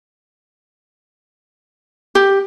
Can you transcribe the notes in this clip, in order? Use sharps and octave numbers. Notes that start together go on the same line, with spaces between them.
G4